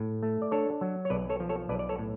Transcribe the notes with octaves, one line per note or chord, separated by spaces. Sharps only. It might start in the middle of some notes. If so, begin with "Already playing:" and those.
Already playing: A2
A3
D5
D4 A4 C#5
F#3
C#5
B1 B4 D5
A4 C#5
F3
A4 C#5
B1 B4 D5
D5
A4 C#5
A2